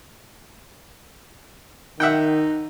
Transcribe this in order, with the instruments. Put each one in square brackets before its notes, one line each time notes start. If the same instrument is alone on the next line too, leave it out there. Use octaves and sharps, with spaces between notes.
[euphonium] D#3 [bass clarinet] D#4 [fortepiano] E5 F#5 G5